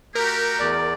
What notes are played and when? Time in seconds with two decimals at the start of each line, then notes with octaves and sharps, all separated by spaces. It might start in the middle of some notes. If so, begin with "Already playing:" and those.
0.15 A3 F#4 G4 A#4
0.59 E2 D5